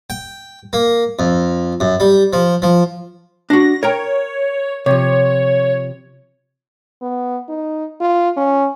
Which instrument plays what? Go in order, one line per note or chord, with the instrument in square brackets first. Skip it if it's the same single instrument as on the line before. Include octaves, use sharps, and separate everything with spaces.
[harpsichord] G5
A#3
F2
F#2
G3
F3
F3
[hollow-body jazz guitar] D4 F#4 [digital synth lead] A#6
[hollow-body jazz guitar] A#4 G5 A#5 [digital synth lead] C#5
[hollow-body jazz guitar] C3 F3 [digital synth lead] C#5
[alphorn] B3
D#4
F4
C#4